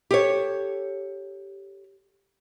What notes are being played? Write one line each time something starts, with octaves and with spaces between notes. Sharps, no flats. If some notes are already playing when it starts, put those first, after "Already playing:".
G4 A4 C#5